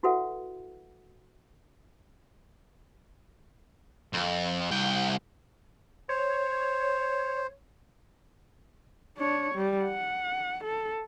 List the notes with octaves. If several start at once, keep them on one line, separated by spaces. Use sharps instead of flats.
E4 F#4 A4 B4 E5 F#5
F2
C2 G5
C5 C#5
D4 C#5
G3
F#5
A4